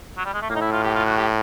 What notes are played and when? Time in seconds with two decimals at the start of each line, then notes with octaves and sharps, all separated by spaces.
0.18 F#3
0.26 G3
0.34 G#3
0.42 A3
0.50 A2 A#3
0.55 D#4
0.61 E4
0.72 F4
0.84 G4
0.95 F4
1.06 F#4
1.17 G4